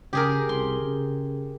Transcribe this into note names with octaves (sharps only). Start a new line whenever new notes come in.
C#3 G4 G#4 A#4
C2 C6
C#3